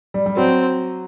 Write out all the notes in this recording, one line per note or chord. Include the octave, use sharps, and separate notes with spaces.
G3
G3
F#3 C4